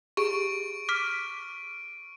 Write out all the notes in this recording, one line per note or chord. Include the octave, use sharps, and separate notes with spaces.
G4 G#4 C#6 D7
D6 F6 B6